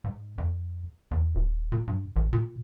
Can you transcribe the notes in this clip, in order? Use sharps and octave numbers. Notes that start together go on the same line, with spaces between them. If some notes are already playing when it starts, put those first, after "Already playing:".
G#2
F2
E2
D#1
A#2
G2
A1
A#2